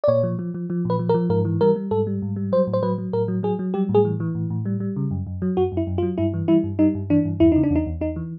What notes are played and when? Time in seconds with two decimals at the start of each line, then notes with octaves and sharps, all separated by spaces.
0.04 D5
0.08 A#2 C#5
0.23 F3
0.39 F3
0.54 F3
0.70 F3
0.85 A#2 B4
0.99 F3
1.09 A#4
1.14 F3
1.30 G#2 A#4
1.45 E3
1.61 G3 A#4
1.76 G3
1.91 G#2 A4
2.07 G3
2.22 G#2
2.36 G3
2.52 F#3 C5
2.67 A2
2.73 C5
2.83 F#3 B4
2.98 F#3
3.13 A2 A#4
3.28 F#3
3.43 F#3 G#4
3.59 F#3
3.74 G3 G4
3.89 A2
3.94 G#4
4.05 E3
4.20 E3
4.35 A2
4.50 A2
4.65 G3
4.80 G3
4.96 C#3
5.11 F#2
5.27 F#2
5.42 F#3
5.57 F#2 F#4
5.72 F#2
5.77 E4
5.87 F#2
5.98 F4
6.03 F#3
6.18 G2 E4
6.34 E3
6.48 G3 E4
6.64 G2
6.79 G3 D#4
6.95 G2
7.10 E3 D4
7.25 G2
7.40 E2 E4
7.52 C#3 D#4
7.63 D4
7.70 E2
7.76 D#4
7.86 E2
8.01 E2 D#4
8.16 E3